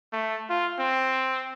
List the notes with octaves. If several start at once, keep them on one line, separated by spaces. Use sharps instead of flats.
A3
F4
C4